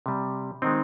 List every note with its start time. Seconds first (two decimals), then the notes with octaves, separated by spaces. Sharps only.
0.06 C3 G3
0.62 D#3 G#3 C4 D#4